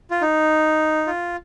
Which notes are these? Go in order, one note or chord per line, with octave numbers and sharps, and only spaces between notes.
F4
D#4
F4